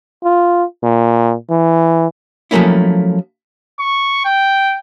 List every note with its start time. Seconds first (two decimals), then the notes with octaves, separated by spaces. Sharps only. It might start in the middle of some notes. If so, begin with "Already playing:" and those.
0.24 F4
0.83 A#2
1.50 E3
2.51 F3 F#3 A3 A#3 C#4 E4
3.79 C#6
4.25 G5